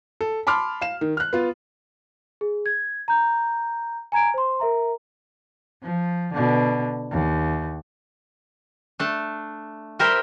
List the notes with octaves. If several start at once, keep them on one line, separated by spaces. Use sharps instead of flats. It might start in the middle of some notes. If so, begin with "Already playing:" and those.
A4
A5 B5 C6 D6 F6
F5 E7
D#3
F6 F#6
B3 F4
G#4
G#6
A#5 G6
G#5 A#5 G#6 D7
C5 C6
A#4 E5 A#5
F3
B2 D3
D#2
A3 D4
G3 G4 A#4 C5 E5 G5